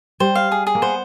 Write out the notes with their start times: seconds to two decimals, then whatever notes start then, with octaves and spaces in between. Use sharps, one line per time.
0.20 G3 C5
0.35 F5
0.52 G#4
0.67 G#4
0.75 A#3
0.82 B3 C5